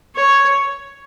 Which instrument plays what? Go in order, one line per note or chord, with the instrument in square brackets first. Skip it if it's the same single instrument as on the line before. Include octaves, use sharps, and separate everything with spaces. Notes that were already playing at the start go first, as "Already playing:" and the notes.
[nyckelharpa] C#5